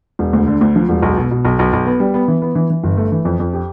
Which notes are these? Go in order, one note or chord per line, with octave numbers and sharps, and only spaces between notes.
E1
D2
D3
D2
F3
E1
B1
B2
B2
B1
B1
B1
B3
G3
B3
E3
B3
E3
E3
G1
A3
E3
F2
F2
G4